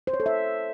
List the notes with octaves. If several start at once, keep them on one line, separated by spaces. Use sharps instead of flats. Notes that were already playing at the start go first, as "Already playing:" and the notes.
C5
C#5
A4
E5